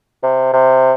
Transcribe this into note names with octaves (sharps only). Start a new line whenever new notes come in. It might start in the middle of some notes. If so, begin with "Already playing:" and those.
C3
C3